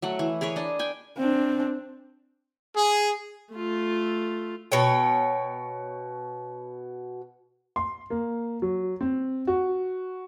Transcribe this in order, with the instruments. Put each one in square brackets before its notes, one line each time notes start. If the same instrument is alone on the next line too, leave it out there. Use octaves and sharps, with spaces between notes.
[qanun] F#3 A3 F#5
E3
G#4 A#4 B4 C#5
D4 D#5
G5 G#5
[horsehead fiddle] C4 D4
[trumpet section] G#4
[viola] A3 F4
[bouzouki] B2 C#5 G5
[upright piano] C6
A#3
F#3
C4
F#4